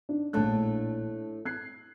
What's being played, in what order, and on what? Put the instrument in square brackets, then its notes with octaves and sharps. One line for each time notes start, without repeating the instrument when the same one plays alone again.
[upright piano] D4 D#4
[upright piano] A#1 A5 F#6 [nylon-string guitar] A2 A3 D4
[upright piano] F#6 G#6 C7